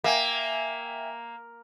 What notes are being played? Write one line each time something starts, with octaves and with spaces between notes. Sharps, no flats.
A#3 E5 G5 G#5